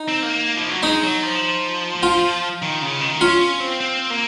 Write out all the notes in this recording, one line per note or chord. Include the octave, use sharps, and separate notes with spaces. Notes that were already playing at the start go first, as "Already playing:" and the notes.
Already playing: D#4
C4
A#3
F3
F#3
G#3 D#4
F#3
F3
F4
D#3
C#3
D#3
C#4 F4
C#4
C4
C4
A#3